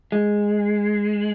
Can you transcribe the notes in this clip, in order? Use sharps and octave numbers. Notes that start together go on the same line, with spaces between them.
G#3